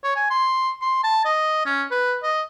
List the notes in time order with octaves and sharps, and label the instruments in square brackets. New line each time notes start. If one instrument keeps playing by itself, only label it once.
[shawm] C#5
G#5
C6
C6
A5
D#5
C#4
B4
D#5